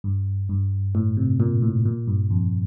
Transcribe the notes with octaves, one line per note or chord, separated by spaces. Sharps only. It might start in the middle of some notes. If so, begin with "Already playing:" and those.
G2
G2
A2
C3
A#2
A2
A#2
G2
F2